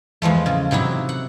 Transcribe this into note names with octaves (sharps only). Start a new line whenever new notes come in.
E2 F3 G#3 A3
C#3
C3 F#3 D#4 E4
F#5